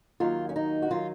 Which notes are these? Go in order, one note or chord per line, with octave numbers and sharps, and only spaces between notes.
D#2 D#3 F#3 F4
C#4
D#4
F#4
D#3 F#3 F4